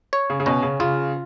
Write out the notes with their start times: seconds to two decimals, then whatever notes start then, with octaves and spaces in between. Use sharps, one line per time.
0.13 C#5
0.30 C#3
0.40 C#3
0.46 B2 C#4
0.63 C#3
0.80 C#3 F4